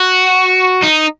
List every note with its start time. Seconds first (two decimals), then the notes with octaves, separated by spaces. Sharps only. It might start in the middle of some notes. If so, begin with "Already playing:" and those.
Already playing: F#4
0.83 D#4